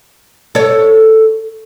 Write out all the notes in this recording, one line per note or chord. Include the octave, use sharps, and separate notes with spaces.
A4 C#5